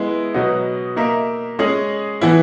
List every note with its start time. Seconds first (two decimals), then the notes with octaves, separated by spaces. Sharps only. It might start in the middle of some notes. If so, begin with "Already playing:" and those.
Already playing: G#3 B3 E4
0.34 B2 F#3 B3 D#4
0.96 A#3 D#4 A#4 E5
1.59 G#3 C#4 G#4 D#5
2.21 E3 B3 E4